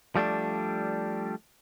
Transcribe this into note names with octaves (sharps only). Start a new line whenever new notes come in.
F3 G3 A3 D4